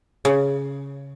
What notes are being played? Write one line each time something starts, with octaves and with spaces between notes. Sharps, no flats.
C#3